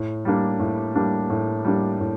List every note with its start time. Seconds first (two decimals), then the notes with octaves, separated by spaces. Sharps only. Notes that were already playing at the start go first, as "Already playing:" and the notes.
Already playing: A2
0.25 G3 A#3 D4
0.60 A2
0.95 G3 A#3 D4
1.30 A2
1.65 G3 A#3 D4
2.00 A2